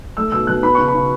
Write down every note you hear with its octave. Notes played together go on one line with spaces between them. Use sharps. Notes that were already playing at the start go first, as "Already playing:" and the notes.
A3 E6
B2 E6
B2 F#6
B3 B5
C#3 C#6
B5
C#3